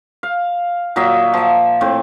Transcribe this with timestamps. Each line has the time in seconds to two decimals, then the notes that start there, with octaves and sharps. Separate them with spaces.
0.23 F5
0.96 A#2 F#3 D#5 E5
1.34 F3 E5
1.81 A2 C4